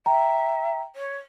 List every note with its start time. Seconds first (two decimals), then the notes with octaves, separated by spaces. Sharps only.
0.06 E5 G5 A#5
0.95 C#5